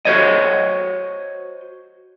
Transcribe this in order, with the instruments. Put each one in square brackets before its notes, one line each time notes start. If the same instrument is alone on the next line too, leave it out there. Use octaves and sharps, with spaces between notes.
[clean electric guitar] F#4 C5 C#5 D#5